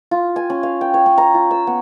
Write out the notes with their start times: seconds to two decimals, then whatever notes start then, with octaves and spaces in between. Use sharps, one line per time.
0.11 F4
0.36 G#5
0.50 C#4
0.63 F5
0.81 G5
0.94 C#5
1.06 C#4
1.18 A#5
1.34 F4
1.51 E6
1.67 B3